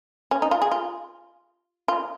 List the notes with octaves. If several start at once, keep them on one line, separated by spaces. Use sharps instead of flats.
C#4
D#4
F4
G#4
F4
F4